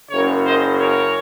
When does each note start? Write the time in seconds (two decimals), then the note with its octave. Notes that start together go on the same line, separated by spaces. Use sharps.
0.10 F#1 F#2 C#3 A#4 C#5
0.46 C5 D#5
0.79 A#4 C#5